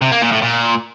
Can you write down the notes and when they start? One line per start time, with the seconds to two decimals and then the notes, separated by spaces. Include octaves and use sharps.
0.01 C3
0.12 A#3
0.22 A#2
0.32 A2
0.42 A#2